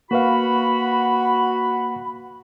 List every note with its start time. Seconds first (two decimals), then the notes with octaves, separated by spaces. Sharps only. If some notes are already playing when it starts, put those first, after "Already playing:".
0.11 A#3 F#4 B4 F5 B5